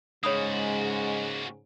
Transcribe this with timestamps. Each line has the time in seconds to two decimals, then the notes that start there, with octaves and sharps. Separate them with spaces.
0.24 G#2 C#3 G#3 A#3 F#4 C#5 B5 D#6